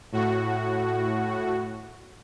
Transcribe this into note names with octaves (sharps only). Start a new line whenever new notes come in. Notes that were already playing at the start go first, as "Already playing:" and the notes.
A2 F#4